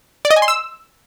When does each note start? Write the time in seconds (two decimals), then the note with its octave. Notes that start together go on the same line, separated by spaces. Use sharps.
0.25 D5
0.31 D#5
0.36 G#5
0.42 C6
0.48 E6